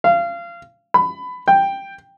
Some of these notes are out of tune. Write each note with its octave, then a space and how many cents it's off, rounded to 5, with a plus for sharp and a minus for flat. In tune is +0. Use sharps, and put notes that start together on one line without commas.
F5 -25
B5 +20
G5 +5